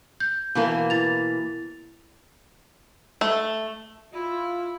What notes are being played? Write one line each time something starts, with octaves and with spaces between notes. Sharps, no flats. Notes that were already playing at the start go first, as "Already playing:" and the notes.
G6
B2 E3 A#3
E4 A6 F7
A3
E4 F4